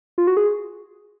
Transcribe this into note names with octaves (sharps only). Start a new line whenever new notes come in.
F4
F#4
G#4